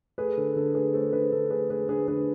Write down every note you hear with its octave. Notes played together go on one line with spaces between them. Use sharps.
A3 G#4 B4
D3 A4
D3 A4
A3 G#4 B4
A3 A4 C5
D3 G#4 B4
D3 A4
A3 G#4 B4
A3 G#4 B4
D3 G#4 B4
D3 G#4 B4